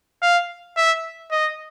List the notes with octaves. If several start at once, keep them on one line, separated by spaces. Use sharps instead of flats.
F5
E5
D#5